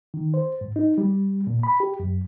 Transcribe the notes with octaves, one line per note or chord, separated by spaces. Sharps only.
D#3
C5
G#2
D#4
G3
A#2
B5
G4
F#2